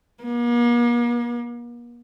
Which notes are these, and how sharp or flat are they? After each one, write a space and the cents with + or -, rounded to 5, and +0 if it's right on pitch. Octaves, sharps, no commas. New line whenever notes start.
A#3 +45